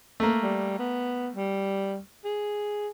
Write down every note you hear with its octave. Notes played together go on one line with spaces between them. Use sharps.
A3 A#3
G3
B3
G3
G#4